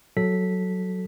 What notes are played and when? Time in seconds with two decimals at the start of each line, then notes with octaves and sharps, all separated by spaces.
0.17 F#3 A4 B6